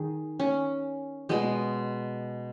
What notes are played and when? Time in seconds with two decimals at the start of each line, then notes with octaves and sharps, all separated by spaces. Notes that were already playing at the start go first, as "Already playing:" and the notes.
Already playing: D#3 G#4
0.40 C#4
1.29 B2 G#3 B3